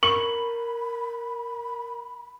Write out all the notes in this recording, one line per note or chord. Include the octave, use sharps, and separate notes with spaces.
A#4 B5 C#6 F#7